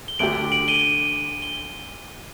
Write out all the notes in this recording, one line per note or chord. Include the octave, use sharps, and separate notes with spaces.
G7
D2 D3 A3 D4 G4 D7 F#7
D7 F#7
D#7 G7
G7